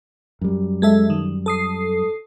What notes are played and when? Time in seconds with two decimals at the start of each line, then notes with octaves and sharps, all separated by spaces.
0.41 F#2 G3
0.82 G#3 A4 E5
1.10 D#3
1.46 A4 D#6 C7